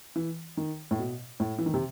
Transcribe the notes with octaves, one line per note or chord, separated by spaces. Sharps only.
E3
D#3
A2
B2
A2
E3
D#3
C3